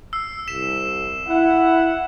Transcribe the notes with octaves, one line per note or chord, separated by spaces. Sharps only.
E6 C7
C2 B6 E7
E4 F#5